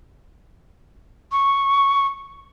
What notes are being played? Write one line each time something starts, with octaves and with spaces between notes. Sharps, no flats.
C#6